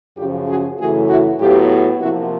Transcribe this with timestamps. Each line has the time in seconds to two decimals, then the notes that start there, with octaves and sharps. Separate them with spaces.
0.18 F#2 C#3 F3 F4 G4
0.48 F#4 G#4
0.79 F#2 C#3 E3 A3 F#4 G#4
1.09 E4 F#4
1.39 A2 F#3 B3 F4 G4
2.00 C3 F3 A#3 E4 F#4